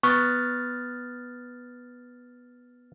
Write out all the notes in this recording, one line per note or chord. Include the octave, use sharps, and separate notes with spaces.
B3 C#6 F6 A6